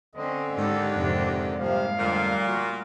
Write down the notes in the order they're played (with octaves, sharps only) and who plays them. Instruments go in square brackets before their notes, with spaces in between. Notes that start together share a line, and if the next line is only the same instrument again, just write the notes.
[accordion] D3 [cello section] C4 C#4 [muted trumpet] D#5
[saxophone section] D#2 G4 [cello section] G#2 [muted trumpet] A4
[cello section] F2 G#2 C3 [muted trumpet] D4
[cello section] G#2 G3 A#3 [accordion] C3 F3 [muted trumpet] F5
[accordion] F2 D3 [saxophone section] A#2 [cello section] G3 A3
[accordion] A#3 F#4